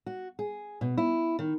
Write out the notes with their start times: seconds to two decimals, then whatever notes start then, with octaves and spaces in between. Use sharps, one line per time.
0.06 F#4
0.39 G#4
0.81 B2
0.98 E4
1.39 D#3